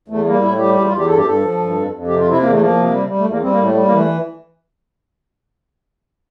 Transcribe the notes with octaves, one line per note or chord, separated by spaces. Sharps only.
E2 A3
G3 A#3
A2 E4
G3 G4
E2 G4
F4
E2
G4
G2 A4
G4
G2 A4
F3
G2
F2
F2
C3 G4
F4
C3
E4
E2 A#3
A3
F3 A#3
C3
G3
G3
A3
E2
A#3
G3 C4
A#3
A2
A3
G3
A#3
E3
A3